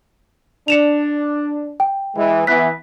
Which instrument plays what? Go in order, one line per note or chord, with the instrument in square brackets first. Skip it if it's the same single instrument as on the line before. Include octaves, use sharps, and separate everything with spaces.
[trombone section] D4 [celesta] C#7 E7 F7
[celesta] G5
[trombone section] E3 G#3
[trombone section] E3 B3 [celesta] F#6 B6